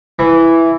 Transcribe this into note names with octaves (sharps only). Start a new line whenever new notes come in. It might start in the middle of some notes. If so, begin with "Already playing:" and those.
E3